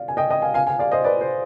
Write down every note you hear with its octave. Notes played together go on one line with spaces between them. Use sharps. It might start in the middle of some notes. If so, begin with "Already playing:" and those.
Already playing: D5 F5
G#5
D#5 G5
D#5 G5
F5 G#5
F5 G#5
F5 G#5
D5 F5
C5 D#5
B4 D5
C5